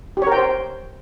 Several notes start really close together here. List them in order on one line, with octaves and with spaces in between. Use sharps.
G4 C#5 A#4 G5 C5